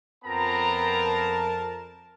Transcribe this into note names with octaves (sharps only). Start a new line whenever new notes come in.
F2 B3 C4 A#4 A5 A#5